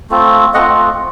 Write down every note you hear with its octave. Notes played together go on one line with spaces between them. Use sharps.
A3 C4 F4
A3 C4 F4 D#5 F#5